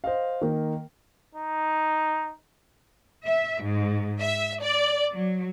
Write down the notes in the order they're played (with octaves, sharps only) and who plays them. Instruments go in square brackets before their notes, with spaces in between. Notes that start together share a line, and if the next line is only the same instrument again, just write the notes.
[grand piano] C5 D#5 F5
D#3 A#3
[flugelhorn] D#4
[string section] E5
G#2
E5
D5
F#3